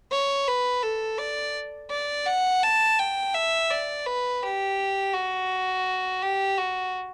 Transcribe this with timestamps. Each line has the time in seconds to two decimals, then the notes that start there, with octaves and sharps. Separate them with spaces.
0.12 C#5
0.48 B4
0.83 A4
1.19 D5
1.91 D5
2.26 F#5
2.63 A5
2.99 G5
3.34 E5
3.71 D5
4.06 B4
4.43 G4
5.13 F#4
6.22 G4
6.58 F#4